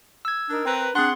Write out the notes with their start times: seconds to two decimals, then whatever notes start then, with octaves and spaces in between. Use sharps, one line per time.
0.25 E6 G#6
0.50 D4 D#4 A#4
0.66 C4 A#4 B4
0.95 C4 D4 G#4 F#5 C6